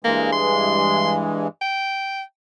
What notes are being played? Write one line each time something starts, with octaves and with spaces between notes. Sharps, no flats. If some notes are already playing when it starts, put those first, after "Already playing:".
G2 E3 G#3 A#3
C6
G5